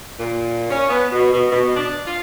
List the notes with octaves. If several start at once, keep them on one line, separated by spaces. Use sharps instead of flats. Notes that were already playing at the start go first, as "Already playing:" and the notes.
A#2
C#4
B3
B2
B2
B2
D4
F4